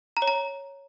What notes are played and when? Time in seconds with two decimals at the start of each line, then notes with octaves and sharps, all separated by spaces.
0.17 A#5
0.22 C#5
0.28 A#5